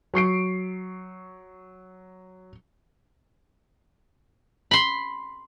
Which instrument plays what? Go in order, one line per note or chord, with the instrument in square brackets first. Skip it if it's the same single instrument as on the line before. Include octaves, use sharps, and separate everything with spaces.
[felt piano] F#3 C#6 C7 D7
[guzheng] B5 C6